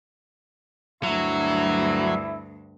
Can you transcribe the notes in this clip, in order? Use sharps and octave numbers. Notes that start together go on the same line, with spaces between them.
D2 G2 F#3 E4